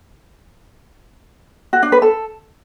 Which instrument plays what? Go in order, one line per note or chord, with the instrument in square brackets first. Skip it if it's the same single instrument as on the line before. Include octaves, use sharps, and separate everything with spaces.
[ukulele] F#4
D4
B4
A4